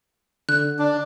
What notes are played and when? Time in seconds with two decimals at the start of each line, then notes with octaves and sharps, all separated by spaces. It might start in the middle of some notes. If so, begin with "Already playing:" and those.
0.49 D3 F#6
0.79 D4